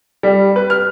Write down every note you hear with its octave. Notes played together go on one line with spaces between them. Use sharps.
G3
B4
F6